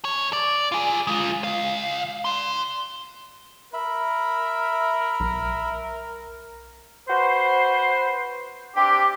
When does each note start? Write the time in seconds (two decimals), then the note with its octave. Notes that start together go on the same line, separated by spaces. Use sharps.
0.05 E2 C#5
0.33 D5
0.72 F4 G#4
1.07 G#3 F4
1.44 C#2 F5
2.25 D5 C6
3.73 A#4 E5 B5
5.20 B1
7.08 F#4 B4 C5
8.76 C4 D4 G4